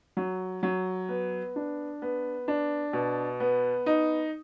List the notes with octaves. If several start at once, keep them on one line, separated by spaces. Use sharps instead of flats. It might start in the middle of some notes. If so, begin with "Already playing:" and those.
F#3
F#3
B3
D4
B3
D4
B2
B3
D#4